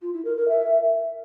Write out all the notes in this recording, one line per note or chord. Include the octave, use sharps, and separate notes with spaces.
F4
E4
A#4
A#4
E5